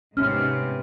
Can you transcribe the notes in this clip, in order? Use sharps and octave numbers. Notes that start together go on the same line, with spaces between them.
G#2 C3 B3 C#4 F6